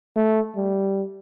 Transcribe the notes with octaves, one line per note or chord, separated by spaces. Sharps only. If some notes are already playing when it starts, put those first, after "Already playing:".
A3
G3